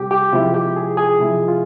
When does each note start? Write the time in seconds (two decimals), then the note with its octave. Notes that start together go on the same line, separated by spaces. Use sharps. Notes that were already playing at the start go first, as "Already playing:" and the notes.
Already playing: C3 G3 C4 G4
0.11 G4
0.32 C3 F3 G#3 E4 F4
0.54 G4
0.76 G#4
0.97 G#4
1.20 C3 F3 G#3 E4
1.48 F4